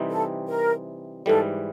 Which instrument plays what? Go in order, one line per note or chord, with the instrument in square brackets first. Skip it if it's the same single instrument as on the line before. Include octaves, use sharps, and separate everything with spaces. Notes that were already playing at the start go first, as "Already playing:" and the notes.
Already playing: [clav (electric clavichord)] C3 E3 G3 C4 D#4
[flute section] A4
A#4
[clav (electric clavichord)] G#2 E3 G3 [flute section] A4